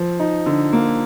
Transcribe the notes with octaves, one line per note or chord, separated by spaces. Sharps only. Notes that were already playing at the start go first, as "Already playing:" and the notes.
Already playing: F3
D#4
D3
A#3